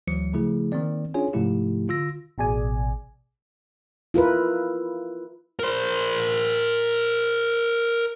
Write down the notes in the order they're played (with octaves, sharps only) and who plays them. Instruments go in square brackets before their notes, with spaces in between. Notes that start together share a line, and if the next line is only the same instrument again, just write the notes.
[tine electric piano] D2 E3 F#3 C#7
C#3 F3 A3 E4 G#4
D#3 A#3 C4 D5
C#4 D4 F4 G#4 C#5 G#5
G#2 C3 F3 A3 E4 G4
D3 F4 E6 A#6
[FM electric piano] A1 B2 G#4 D5 G#5
[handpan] E4 F4 A#4 B4
[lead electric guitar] A#4 C5